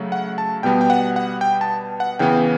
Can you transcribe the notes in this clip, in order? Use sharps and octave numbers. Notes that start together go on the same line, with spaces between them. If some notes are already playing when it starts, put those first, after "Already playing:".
Already playing: C#3 F#3 A3
F#5
A5
B2 G3 B3 G5
G5
F#5
F#5
G5
A5
F#5
C#3 E3 B3 G5